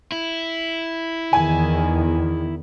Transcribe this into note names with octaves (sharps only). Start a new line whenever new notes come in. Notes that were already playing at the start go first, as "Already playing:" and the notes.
E4
E2 D#3 G#5